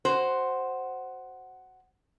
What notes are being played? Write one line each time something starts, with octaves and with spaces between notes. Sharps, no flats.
F#4 C5